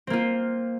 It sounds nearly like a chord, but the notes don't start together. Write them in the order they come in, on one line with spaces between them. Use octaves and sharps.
C4 A#3 F4